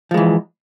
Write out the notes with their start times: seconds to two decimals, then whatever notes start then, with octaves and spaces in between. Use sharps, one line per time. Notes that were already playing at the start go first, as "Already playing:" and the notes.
0.11 F3
0.14 G#3
0.17 E3